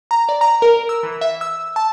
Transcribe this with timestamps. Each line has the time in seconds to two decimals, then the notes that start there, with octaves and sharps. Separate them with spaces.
0.11 A#5
0.29 D5
0.41 A#5
0.62 A#4
0.89 E6
1.03 E3
1.21 E5
1.41 E6
1.76 A5